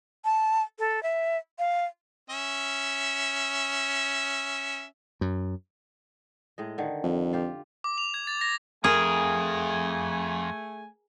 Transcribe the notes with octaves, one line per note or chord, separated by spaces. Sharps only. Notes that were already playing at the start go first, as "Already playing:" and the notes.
A5
A4
E5
F5
C#4 E5
F#2
A2 G#3 D#5
D3 D#3
F2
F4 G4
D6
F7
G#6
A6
A#6
F2 A3 G#4 A#4 G#5